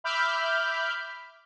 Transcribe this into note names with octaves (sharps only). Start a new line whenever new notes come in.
E5 B5 D6 F6 G6